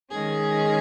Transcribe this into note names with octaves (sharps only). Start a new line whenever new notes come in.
D#3 G#3 C#4 G#4